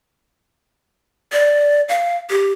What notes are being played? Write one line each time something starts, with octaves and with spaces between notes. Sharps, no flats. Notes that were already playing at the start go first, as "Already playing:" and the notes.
D5
F5
G4